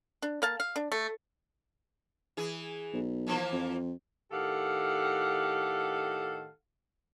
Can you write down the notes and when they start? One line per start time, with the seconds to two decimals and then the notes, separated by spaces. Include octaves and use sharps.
0.22 D4
0.42 A#3 F5 A5
0.60 F5
0.76 D4
0.92 A3
2.37 E3 G#4
2.93 B1
3.27 E3 F3 A#3
3.52 F2
4.31 A2 D#3 G4 A4 F5 F#5